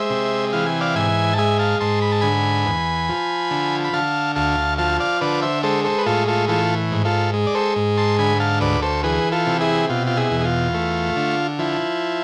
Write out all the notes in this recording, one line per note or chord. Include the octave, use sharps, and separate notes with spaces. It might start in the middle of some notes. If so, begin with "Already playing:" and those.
Already playing: G#3 C5 E5
C3
E3 F5
G#5
D5 F5
G#2 E5 G#5
A5
G#3 E5 G#5
F5 A5
G#2 A5 C6
B5
A5
D3 G#5 B5
E2
F3
D3
B5
D3 F5 A5
D2 F5 A5
F3 F5 A5
D5 F5
D3 B4 D5
C5 E5
G#3 A4 C5
A4 C5
B4
A2 F4 A4
F4 A4
E3 F4 A4
G#2
F4 A4
G#3
D5
A4 C5
G#2
A5 C6
D3 G#5 B5
F5 A5
D2 B4 D5
A4 C5
E3 G#4 B4
F4 A4
C3
E4 G#4
B2 F4
F4
E4 G#4
E2
G#4
F4
A3
D3
F3 E4